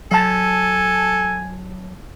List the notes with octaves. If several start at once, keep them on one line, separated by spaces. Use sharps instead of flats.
F#3 A4 G#5 A5